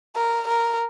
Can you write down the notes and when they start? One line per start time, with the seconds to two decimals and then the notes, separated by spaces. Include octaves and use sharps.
0.16 A#4
0.48 A#4